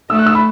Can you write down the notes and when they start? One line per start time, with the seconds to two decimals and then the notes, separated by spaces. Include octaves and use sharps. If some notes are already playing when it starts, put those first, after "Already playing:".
0.10 A3 E6
0.19 F#6
0.26 E6
0.35 B5